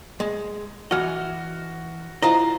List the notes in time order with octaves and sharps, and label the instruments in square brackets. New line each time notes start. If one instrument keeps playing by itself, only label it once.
[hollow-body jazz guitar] G#3
[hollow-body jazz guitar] E3 D#5 [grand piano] F#4 F6
[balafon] E4 A#5 [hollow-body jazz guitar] F4 C5 D#5